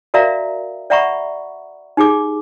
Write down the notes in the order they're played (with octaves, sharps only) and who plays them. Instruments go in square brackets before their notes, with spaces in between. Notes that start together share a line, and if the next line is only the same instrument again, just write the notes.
[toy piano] F#4 A#4 D5 E5 F5 A#5
D5 E5 F#5 A#5 B5 C#6
D#4 G4 G#4 D6